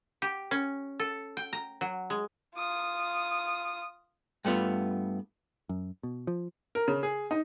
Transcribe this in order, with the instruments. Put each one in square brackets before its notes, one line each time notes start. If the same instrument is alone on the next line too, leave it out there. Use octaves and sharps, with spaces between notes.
[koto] G4
C#4
A4
G5
A#5
F#3
G#3
[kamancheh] F4 D#6
[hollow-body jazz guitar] G2 A3 B3 F4
[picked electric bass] F#2
B2
F3
[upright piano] A#4
C#3
G#4
D#4